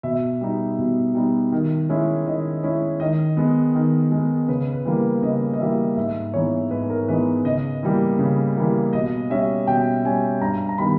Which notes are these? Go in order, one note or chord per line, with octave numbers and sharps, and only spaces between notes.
B2 E5
G3 B3 D#4
B2
G3 B3 D#4
D#3
G#3 C#4 E4
D#3 D#5
G#3 C#4 E4
D#3 D#5
G#3 B3
D#3
G#3 B3
C#3 B4
B4
E3 G3 A#3
B4
C#3 D#5
D#5
E3 G3 A#3 E5
G#2 E5
E3 G#3 B3 D#4 C#5
G#2 B4
A#4
E3 G#3 B3 D#4 B4
C#3 D#5
E3 G3 A#3
C#3
E3 G3 A#3
B2 D#5
G3 C#4 E5
B2 G5
G3 C#4 G#5
G2 A#5
A#5
D#3 G3 B3 B5